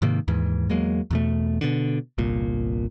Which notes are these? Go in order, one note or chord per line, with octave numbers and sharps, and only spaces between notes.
G#2 C3 D#3 A#3
D#2 G#2 E3
E2 F#3 G#3 A#3
E2 B2 A3
B2 D3
G1 C2 A#2